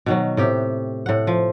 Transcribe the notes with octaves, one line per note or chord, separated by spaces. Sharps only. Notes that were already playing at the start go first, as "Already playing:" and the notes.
B2 D#3 F#3
A2 C3 G4
A2 F#5
F3